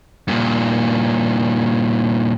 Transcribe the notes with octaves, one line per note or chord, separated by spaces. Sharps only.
G2 A#2